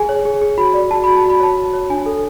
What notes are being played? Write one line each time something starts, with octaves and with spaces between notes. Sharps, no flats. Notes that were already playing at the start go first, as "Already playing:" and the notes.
Already playing: G#4 G#5
C#5
G#4
G#4
F#4 B5
D5
F#4 A5
F#4 B5
A5
F#4
B5
C#5 A5
F#4
C#5
D4 G#5
A4